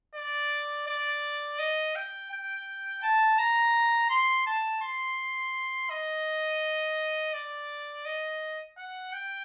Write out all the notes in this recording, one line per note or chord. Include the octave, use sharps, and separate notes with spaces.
D5
D5
D#5
G5
G5
A5
A#5
C6
A5
C6
D#5
D5
D#5
F#5
G5